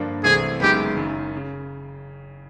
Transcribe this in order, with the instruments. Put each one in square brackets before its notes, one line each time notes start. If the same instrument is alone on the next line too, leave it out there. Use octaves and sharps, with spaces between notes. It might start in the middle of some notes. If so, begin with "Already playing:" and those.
Already playing: [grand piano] G2 D3 F3 A#3 D4
[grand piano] C2 C3 E3 A3 C4 [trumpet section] G#4
[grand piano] F#1 F#2 D#3 G#3 B3 [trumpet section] G4
[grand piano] F#1 F#2 D#3
C#3